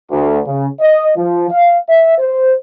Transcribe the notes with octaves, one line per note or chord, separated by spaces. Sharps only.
D2
C#3
D#5
F3
F5
E5
C5